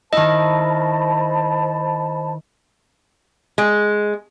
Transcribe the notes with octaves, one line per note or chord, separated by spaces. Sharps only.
D#3 E4 C5 D#5 A5 B5
G#3